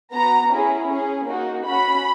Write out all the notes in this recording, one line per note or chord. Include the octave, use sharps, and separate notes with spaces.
B3 F#4 A#5
C#4 E4 G#4
C#4 G#4
A#3 D#4 F#4
C#4 F#4 B5